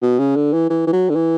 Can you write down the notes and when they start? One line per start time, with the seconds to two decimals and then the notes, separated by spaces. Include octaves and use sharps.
0.02 B2
0.19 C#3
0.36 D3
0.53 E3
0.70 E3
0.87 E3
0.93 F#3
1.10 D3
1.15 E3